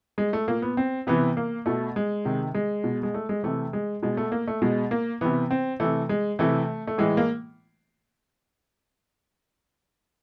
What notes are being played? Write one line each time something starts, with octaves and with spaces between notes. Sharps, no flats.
G#3
A3
A#2 A#3
B3
C4
C3 E3 B3
A#3
B2 A3
G#3
C3 D#3
G#3
B2
G#3
A3
G#3
C3 E3 A3
G#3
B2 G#3
A3
A#3
A3
B2 G#3
A#3
C3 E3 B3
C4
C3 E3 A3
G#3
C3 E3 A3
A3
A2 E3 G#3
A#3